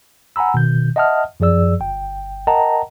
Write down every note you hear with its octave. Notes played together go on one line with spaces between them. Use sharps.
F#5 G#5 A#5 B5 E6
B2 D#3 G6
D#5 E5 F#5 A5 D#6 F6
F#2 F3 G#4 D5 E6
G1 G5
A#4 D#5 F#5 G5 A5 A#5